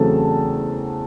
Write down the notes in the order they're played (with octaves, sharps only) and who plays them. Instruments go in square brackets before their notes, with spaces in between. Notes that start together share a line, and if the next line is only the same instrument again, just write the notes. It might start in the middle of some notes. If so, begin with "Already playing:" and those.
Already playing: [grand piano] E2 C#3 F#3 A3 C4 A4 A5